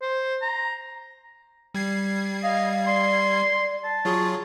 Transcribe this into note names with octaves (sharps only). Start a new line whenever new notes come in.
C5
A#5
G3 G#6 C7
D#5 F5
D5 C6
A5
F#3 F4 G#4 C#6